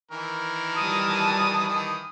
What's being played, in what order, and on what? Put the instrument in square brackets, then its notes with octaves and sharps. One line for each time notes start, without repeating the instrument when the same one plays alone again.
[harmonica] D#3 E3 A#4
[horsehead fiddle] G3 A5 [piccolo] D#6
[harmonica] D#3 E3